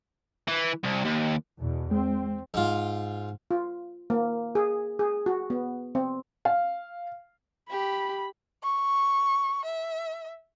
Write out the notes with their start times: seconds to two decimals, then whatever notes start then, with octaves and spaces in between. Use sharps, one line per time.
0.48 E3
0.84 C2
1.05 D#2
1.60 E2 B2
1.91 G#3 C4
2.54 G#2 F4
3.51 F4
4.10 A#3
4.55 G#4
4.99 G#4
5.26 F#4
5.50 B3
5.95 C4
6.45 F5
7.71 G4 B5
8.63 C#6
9.65 E5